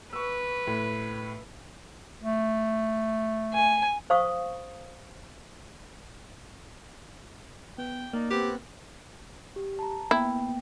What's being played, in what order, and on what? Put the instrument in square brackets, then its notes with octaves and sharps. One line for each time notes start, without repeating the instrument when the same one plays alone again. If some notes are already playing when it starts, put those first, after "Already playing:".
[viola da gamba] B4 [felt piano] C#6 E6
[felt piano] A2
[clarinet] A3
[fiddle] G#5
[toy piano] C5 F5 C#6 D#6
[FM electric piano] B3 [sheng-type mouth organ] G5
[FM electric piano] A#3 [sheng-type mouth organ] D#4 D5
[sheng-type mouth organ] B3 C4 F#6 [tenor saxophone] G4
[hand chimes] G4
A5 A#5
[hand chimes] A#3 B3 G5 [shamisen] E4